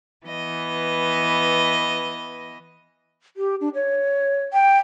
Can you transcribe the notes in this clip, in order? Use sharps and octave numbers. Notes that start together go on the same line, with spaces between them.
E3 B3 D#5
G4
D4
C#5
G5